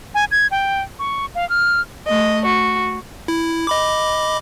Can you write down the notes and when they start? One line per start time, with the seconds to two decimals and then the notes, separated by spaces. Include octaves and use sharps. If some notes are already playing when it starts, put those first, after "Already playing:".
0.15 G#5
0.31 G#6
0.51 G5
0.99 C#6
1.35 F5
1.49 F6
2.07 A3 D#5
2.45 F#4
3.28 E4
3.67 D#5 B5 D6